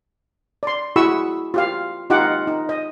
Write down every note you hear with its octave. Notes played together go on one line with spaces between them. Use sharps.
D5 C6
E4 F#4 G#4 B5 C#6 E6
F4 G4 F5
D#4 F4 G4 F#5 D6
D#4
D#5